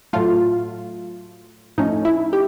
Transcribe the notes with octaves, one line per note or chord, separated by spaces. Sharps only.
A2 F#3 A3 F4
A2 F3 A3 C#4 D#4
E4
G4